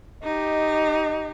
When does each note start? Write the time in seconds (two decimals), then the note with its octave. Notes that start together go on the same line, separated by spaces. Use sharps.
0.23 D#4 G4 D#5